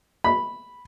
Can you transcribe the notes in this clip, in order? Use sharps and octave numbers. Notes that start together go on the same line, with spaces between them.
B5